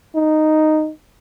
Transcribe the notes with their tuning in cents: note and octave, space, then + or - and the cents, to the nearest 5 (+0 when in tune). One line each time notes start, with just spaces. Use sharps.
D#4 -5